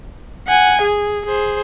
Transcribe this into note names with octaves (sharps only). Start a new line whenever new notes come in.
F#5 G#5
G#4
G#4 C5